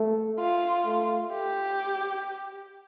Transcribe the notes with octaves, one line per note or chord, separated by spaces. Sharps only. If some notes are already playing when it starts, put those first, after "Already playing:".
Already playing: A3
F4
A3
G4